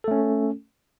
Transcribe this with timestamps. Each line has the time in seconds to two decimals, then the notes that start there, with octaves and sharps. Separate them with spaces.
0.04 A4
0.08 A3
0.11 C#4